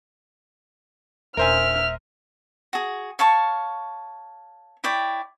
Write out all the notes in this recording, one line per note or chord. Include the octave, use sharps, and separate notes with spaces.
D#1 A#4 C5 E5 G#5 F6
F#4 G#4
C#5 F5 A5 C#6
E4 C#5 D5 G5